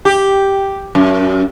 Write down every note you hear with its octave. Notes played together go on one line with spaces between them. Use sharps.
G4
F#2